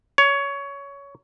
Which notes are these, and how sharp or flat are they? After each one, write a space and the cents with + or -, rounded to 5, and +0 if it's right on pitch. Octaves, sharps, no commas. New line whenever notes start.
C#5 +15